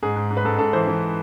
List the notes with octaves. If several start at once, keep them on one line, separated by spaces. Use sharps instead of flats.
G#2 G#4
G#2
G#2
B4
G#2 A4
G#2 A4
E3 C5
E3